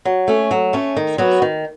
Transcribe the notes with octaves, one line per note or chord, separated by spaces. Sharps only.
F#3
A3 C#4
F#3
A3 C#4
D#3
F#3 B3 F#4
D#3